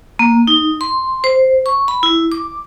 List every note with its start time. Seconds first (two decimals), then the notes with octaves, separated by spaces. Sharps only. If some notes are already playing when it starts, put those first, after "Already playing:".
0.19 A#3
0.47 D#4
0.81 C6
1.24 C5
1.66 C#6
1.88 B5
2.03 E4
2.32 D6